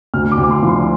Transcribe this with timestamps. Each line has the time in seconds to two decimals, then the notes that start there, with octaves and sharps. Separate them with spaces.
0.14 D2 F6
0.32 D6
0.38 D2
0.44 D6
0.51 C6
0.63 F3
0.69 C6